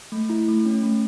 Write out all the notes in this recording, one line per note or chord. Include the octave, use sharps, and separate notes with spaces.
A3
E4
A3
C#4
A3